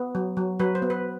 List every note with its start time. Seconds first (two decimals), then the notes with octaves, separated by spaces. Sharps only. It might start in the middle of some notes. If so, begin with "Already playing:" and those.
Already playing: B3
0.15 F#3
0.37 F#3
0.59 F#3 B4
0.75 C5
0.82 B3
0.90 B4